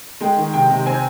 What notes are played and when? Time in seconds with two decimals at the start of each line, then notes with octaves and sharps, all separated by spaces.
0.21 G#3 G5
0.36 D#3
0.53 C3 G5
0.70 C3
0.86 C4 G#5